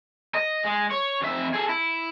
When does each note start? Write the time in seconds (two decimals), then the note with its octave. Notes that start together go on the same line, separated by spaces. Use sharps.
0.34 D#5
0.65 G#3
0.91 C#5
1.22 F2 E5
1.54 G#4 A4
1.69 E4